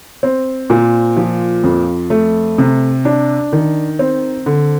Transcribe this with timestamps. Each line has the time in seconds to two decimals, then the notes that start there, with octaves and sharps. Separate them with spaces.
0.23 C4
0.70 A#2
1.17 F3
1.64 F2
2.10 A3
2.58 C3
3.05 D4
3.53 D#3
3.99 C4
4.46 D3